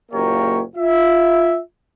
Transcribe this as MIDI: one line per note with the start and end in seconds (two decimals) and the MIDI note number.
0.12 0.61 30
0.12 0.61 46
0.12 0.61 58
0.12 0.61 67
0.12 0.61 70
0.12 0.61 73
0.76 1.59 65
0.76 1.59 76